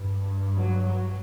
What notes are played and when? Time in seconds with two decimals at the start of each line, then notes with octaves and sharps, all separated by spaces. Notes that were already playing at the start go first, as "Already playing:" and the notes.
Already playing: G2
0.57 F#3
0.85 F#3